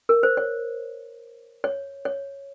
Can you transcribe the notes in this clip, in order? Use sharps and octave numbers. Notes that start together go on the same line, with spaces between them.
A#4
C5
C#5
C#5
C#5